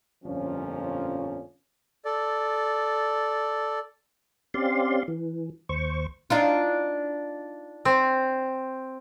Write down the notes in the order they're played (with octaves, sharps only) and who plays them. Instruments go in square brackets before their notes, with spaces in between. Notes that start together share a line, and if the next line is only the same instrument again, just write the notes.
[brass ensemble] G1 F2 A#2 F3 C#4
[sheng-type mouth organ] A4 D5
[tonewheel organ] C4 C#4 G4 D5 F5 C6
E3
D#2 C5 C#6
[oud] D4 D#4 F4
[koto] C4